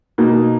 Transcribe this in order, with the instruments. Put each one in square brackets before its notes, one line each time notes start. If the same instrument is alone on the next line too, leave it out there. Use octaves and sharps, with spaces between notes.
[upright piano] B2 A#3 D#4